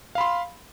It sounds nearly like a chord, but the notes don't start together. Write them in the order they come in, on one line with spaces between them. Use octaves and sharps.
F5 B5 C6